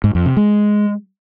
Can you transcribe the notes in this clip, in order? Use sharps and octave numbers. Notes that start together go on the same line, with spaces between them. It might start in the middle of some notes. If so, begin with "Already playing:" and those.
G#2
F2
C3
G#3